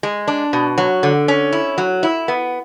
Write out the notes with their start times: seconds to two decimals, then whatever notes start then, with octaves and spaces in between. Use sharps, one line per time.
0.03 G#3
0.28 D4
0.53 B2
0.78 F#3
1.03 D3
1.28 C#4
1.53 E4
1.78 F#3
2.03 E4
2.28 B3